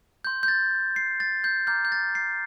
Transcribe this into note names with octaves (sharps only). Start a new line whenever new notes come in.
C6 G6
G6
A6
C7
A6
G6
A#5 D6 F6 G6
G6
A6
C7